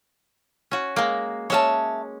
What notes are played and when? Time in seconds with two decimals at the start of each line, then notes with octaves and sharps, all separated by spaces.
0.71 C#4 F#4
0.96 G#3 A#3
1.50 G#3 C#4 C#5 E5 A5